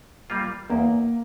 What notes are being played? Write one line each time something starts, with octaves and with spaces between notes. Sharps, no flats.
G3 A#3 F4
E2 A#3